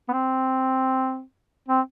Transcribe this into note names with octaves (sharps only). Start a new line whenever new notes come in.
B3
C4
C4